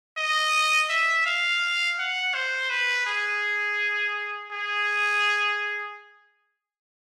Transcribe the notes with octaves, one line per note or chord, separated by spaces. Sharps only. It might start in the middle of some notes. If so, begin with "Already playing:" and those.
D#5
E5
F5
F#5
C5
B4
G#4
G#4